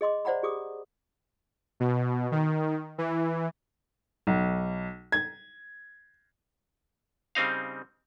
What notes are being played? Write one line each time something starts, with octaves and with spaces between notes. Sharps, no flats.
G#4 D#5 C6 D6
C5 D5 F#5 A#5 B5
G4 G#4 D6 D#6
B2
D#3
E3
B1
G#6
C#3 G3 C4 D#4 F5